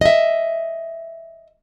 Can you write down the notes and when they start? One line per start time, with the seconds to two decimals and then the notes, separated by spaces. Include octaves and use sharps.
0.01 D#5 E5